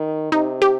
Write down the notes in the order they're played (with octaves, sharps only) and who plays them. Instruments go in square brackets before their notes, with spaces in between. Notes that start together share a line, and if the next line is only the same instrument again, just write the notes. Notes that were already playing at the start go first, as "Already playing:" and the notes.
Already playing: [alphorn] D#3
[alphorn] C3 [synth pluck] D#4
[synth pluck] G4